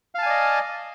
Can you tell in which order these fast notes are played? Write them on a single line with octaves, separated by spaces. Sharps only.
F5 A5 G#5 D5 D#5